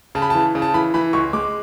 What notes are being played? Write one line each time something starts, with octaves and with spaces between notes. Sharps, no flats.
C#3 A5
B5
E3 A5
C#3
A5
E3 B5
E3 B5
C#2 C#6
G#3 D6